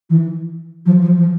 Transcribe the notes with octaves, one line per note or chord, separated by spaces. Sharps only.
E3
F3
F3
F3